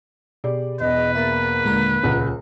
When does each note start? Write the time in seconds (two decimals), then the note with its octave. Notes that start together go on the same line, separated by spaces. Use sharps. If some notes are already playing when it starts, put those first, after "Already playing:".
0.44 B2 G4 G#4 D5
0.80 E1 E2 B4 D#5
1.15 A#3 E5 B5 A6
1.64 D#2 A#2 D3 G#3 A#5
2.03 D#1 C#2 C#5 F#5